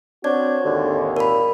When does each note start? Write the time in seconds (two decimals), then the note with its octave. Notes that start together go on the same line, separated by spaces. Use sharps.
0.24 C4 D4 F#4 C#5 G#6
0.65 G#1 D#2 D3
1.17 A#2 A#4 B5